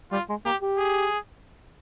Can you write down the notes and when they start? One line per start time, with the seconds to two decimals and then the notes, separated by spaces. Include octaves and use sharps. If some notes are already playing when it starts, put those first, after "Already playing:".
0.12 G3 F4
0.29 G#3
0.45 A#3 G4
0.62 G4
0.78 G#4